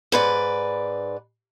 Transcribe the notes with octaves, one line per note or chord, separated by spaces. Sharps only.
G#2 B4 D5